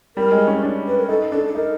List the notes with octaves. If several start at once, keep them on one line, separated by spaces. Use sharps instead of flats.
G3 A#4
G#3
C#4
D4
B4
A#4
D#4 A4
D4 A4
A4
D#4 A#4